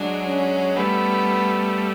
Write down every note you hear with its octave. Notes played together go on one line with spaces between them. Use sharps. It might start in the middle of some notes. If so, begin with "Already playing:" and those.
Already playing: F#3 G#3 D4
C#4
G3 A3 B3